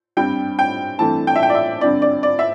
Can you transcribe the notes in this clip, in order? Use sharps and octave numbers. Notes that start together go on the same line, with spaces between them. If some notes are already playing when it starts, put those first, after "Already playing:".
G2 G3 C4 G5
G5
G2 E3 A3 C4 A5
G5
E5
G5
D5
E5
G2 D3 C4 D5
D5
D5
E5